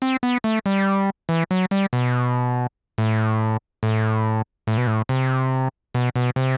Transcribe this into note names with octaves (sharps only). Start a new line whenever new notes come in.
C4
B3
A3
G3
E3
F#3
G3
B2
A2
A2
A2
B2
A2
C3
B2
B2
C3